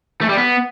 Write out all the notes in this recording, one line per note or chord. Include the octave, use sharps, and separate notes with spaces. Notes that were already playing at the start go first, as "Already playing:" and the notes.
A3
G3
B3